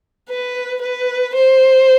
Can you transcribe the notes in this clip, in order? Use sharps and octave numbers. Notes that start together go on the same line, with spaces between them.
B4
B4
C5